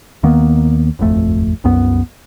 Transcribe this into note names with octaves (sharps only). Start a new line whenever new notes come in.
D#2 D#3 A#3 B3
D#1 G#1 F2 A3
C2 F#2 B3